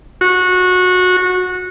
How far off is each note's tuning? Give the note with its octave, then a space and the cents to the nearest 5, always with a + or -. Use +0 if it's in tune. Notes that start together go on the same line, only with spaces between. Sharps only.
F#4 -20